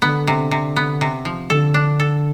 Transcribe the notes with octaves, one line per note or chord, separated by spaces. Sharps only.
D3 B3
C3
C3
B3
C3
F3
D3 A4
D4
A4